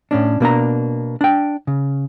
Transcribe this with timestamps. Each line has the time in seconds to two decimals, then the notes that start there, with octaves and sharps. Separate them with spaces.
0.11 A2 C#4 D4
0.40 B2 A#3 D4 A#5
1.21 D4 G5
1.67 C#3